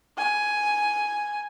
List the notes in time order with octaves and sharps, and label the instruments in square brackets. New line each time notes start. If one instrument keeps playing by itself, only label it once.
[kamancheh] G#5